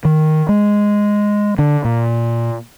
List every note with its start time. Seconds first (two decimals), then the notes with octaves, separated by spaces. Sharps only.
0.05 D#3
0.49 G#3
1.59 D3
1.85 A#2